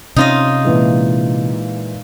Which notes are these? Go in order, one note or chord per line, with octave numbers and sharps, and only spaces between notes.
C3 C#4 D#4 F4 D#5
A#2 E3 G#3